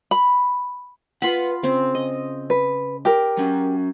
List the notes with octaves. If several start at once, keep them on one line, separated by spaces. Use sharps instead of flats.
B5
F4 B4 F#5 B5
C#3 C4
D#5
B4
G4 A#4
F#3 C#4